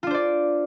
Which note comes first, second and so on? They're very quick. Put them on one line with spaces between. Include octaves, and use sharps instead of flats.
F4 D4 C5 D5